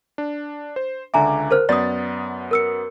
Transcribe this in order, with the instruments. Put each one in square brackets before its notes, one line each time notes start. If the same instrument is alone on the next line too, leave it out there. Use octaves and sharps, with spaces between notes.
[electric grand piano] D4
C5
[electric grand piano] C#2 D3 D6 [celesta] E5 G#5 A#5
[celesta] A#4 C5 F6
[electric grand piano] F#2 B3 A6 [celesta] D5 D#6
[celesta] A#4 E6 C#7